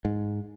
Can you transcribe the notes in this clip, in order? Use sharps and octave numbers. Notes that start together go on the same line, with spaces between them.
G#2